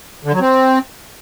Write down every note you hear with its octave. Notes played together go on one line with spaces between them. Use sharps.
D3
F#3
C4